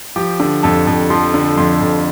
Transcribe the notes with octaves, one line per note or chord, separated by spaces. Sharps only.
F3 G4
D3
F2 A4
F2
F3 C6
D3
F2 C6
F2